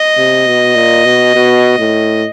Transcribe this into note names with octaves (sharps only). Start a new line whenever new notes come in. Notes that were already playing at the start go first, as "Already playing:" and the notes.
Already playing: D#5
C3
B2
A#2
B2
B2
A2